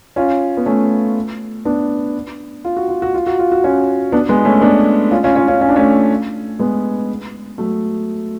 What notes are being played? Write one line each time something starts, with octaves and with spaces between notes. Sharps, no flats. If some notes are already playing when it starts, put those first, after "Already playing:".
C#4 F4
B3
A3 C#4
B3 D4
F4
F#4
F4
F#4
F4
F#4
F4
F#4
C#4 F4
B3 D4
G#3 B3
A3 C#4
B3 D4
C#4 F4
C#4 F4
C#4 F4
C#4 F4
C#4
D4
A3 C#4
G#3 B3
F#3 A3